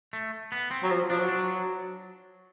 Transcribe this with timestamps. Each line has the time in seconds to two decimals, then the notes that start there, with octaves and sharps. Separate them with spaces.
0.13 A3
0.52 B3
0.71 C4
0.83 F#3
0.91 F3
1.10 F3 D4
1.19 F#3
1.29 D4